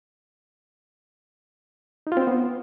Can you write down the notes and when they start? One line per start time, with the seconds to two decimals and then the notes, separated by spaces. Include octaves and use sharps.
2.07 D#4
2.12 F4
2.17 C4
2.22 C5
2.27 B3